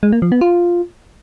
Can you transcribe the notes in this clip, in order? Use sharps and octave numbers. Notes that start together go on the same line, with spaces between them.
G#3
A#3
F3
B3
F4